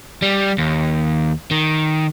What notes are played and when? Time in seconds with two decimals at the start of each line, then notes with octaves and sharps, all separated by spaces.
0.22 G3
0.58 D#2
1.51 D#3